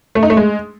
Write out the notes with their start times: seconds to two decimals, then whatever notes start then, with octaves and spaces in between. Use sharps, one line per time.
0.15 A3
0.23 D#4
0.30 A3
0.37 G#3